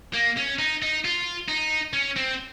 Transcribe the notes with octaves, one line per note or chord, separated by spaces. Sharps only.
A#3
C#4
D#4
D#4
F4
D#4
C#4
C4